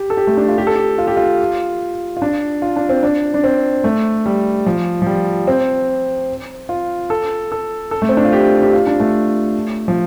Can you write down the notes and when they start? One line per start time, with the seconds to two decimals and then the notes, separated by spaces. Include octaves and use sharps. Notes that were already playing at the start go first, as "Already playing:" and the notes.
Already playing: G4
0.10 A4
0.17 G4
0.27 A3
0.37 D4
0.48 F4
0.58 G4
0.67 A4
0.75 G4
0.98 F4
1.07 G4
1.17 F4
2.17 F4
2.22 D4
2.62 F4
2.76 D4
2.89 C4
3.03 D4
3.34 D4
3.44 C4
3.84 A3
4.26 G3
4.66 F3
5.02 F3
5.06 G3
5.47 C4
6.69 F4
7.10 A4
7.52 A4
7.91 A4
8.02 A3
8.09 C4
8.17 D4
8.25 F4
8.33 G4
8.62 G4
8.73 F4
8.87 D4
9.00 A3
9.88 F3